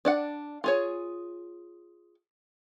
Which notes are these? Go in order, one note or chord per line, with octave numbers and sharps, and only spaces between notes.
D4 D5 F#5
F4 G#4 C#5